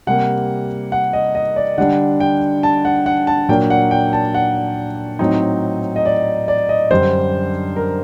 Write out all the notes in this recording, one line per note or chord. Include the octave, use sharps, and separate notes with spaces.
C3 G3 A#3 F#5
F#5
D#5
D#5
D5
D3 G3 D4 F#5
G5
A5
F#5
F#5
A5
A#2 F#3 A#3 D4 G5
F#5
G5
A5
F#5
A2 F#3 C4 D#4
D#5
D5
D5
D#5
F#2 D3 G3 D4 C5
A#4